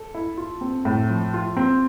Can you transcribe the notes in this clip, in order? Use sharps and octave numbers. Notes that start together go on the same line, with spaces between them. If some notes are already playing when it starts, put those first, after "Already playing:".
Already playing: A4
E4
F4
C4
A2
F3
F4
C4